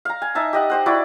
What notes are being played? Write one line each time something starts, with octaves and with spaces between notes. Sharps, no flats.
F5 A#5
G#5
D#4 E5 A5
G4 D#5 F#5
G4 C5 F#5
E4 F#4 D5 B5